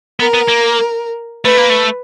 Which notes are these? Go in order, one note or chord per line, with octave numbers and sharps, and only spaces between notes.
B3 A#4
B3
A#3
A3 B4
A#3
A3